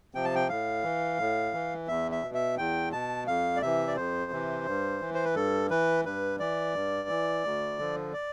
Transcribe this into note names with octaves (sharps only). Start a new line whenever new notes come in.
C3 F3 G5
A5
G5
A2 F5
E3
A2
E3
E2 E5
E5
B2
E5
E2 G5
B2 A5
F2 F5
D5
C3 E3 E5
D5
F2 C5
C3 E3
G2
E3
C5
B4
G2 A4
E3 B4
G2 B4
E3 D5
G2
E3
D2
D3 F3
D5